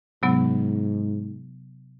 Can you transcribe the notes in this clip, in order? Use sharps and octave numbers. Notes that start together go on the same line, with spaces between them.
G#2 C3 F#3 B3